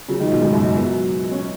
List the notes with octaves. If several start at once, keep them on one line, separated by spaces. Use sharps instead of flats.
C#3 F#3
D#3 G#3
B2 D#3
G#2 C#3
F#2 B2
G#2
F#3 B3
C#4